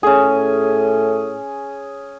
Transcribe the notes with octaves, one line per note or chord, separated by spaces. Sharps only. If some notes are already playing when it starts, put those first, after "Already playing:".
A2 C#4 G#4